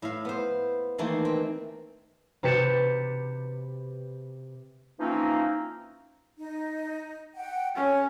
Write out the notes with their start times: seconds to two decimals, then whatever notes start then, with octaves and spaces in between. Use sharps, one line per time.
0.02 A2 E5 F5
0.25 B3 C5
0.98 D#3 E3 A3 A#3 C5
1.25 C4
2.43 C3 G4 B4 A6 C#7 E7
5.00 E3 F3 A#3 C4 C#4 D#4
6.38 D#4
7.35 F#5 G5
7.75 C#4 A4 C#5